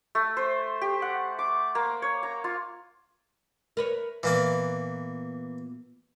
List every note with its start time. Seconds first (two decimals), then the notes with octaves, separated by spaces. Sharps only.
0.15 A3
0.37 C5
0.81 G4
1.02 F#5
1.39 D6
1.75 A#3
2.02 C#5
2.23 A#5
2.44 F4
3.77 A#4 B4 C#5
4.23 A#2 E3 A#3 B3 D5